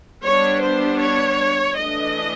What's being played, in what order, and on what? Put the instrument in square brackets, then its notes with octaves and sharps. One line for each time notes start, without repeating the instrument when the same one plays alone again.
[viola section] G3 B3 D4 C#5
C5
C#5
E3 A3 D4 D#5